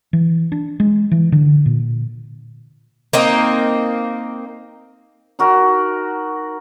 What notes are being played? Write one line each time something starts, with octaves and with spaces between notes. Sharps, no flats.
E3
D4
G#3
E3
D3
A#2
A#3 C4 D#4
D#4 F#4 A#4